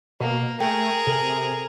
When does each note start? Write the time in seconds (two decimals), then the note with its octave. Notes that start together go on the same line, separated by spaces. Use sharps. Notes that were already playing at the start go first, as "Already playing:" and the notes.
0.20 B2 A#3
0.60 A3 G#4 A#4 G5
1.07 C3 A4